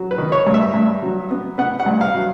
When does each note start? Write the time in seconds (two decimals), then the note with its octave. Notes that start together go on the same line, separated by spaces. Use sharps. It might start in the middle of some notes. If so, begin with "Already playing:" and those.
Already playing: F#3
0.11 B4
0.18 D#3
0.32 C#5
0.47 G2
0.54 E5
0.74 G2
1.02 F#3
1.31 B3
1.58 B3 F#5
1.80 F#5
1.86 G2
2.01 F5
2.14 F#3